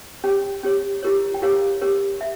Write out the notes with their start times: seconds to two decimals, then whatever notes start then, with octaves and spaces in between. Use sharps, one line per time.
0.24 C#4 G4 C#5 G5
0.63 C#4 G4 C#5
1.03 E4 G4 A#4 C#5
1.34 G5
1.42 E4 G4 A#4 C#5 F5
1.81 C#4 G4 A#4 C#5
2.21 E5